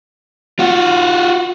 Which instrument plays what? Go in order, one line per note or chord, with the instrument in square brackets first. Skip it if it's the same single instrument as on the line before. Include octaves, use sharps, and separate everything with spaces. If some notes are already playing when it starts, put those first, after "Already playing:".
[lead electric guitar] F4 F#4